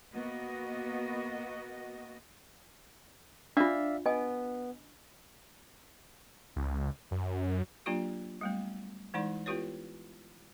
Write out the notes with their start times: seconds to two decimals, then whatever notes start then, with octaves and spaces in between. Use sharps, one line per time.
0.14 A#3 B3 F#4 D#5
3.57 D4 F4 D5 E5 F5
4.06 B3 D#5 G#5
6.56 C#2
7.11 F#2
7.86 F#3 A#3 D4 F4 G4
8.41 G3 A3 B3
9.14 E3 G#3 D#4 E4 D5
9.46 B3 E4 F4 G4 B4 C#5